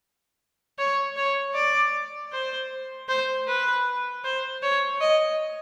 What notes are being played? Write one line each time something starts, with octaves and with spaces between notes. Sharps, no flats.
C#5
C#5
D5
C5
C5
B4
C5
C#5
D#5